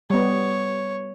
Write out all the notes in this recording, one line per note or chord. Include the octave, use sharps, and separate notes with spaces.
G3 B3 C#5